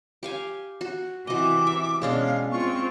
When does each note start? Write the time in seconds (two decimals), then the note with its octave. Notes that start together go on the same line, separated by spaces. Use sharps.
0.23 G4 F5 G#5
0.81 F#4
1.27 C3 E3 F#4 D#5 D6
1.67 E5
2.02 B2 G#3 C#4 D4 F5
2.52 C4 F4 C#6